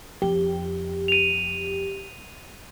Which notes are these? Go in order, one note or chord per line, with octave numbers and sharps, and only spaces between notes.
F2 G4
D#7 F7